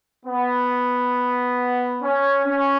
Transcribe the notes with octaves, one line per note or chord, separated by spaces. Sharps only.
B3
C#4
C#4